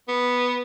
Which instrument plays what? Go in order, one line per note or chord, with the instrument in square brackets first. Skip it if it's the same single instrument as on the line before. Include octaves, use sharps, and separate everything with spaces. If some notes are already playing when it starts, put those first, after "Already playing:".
[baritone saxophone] B3